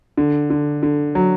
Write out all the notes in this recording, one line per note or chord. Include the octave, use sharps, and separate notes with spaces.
D3
D3
D3
F#3